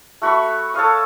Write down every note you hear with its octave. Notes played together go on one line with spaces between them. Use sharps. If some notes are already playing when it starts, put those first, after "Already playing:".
A3 F#4 B5 C#6
A4 C#5 F5 D#6